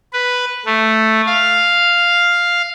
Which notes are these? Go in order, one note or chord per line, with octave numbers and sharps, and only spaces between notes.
B4
A3
F5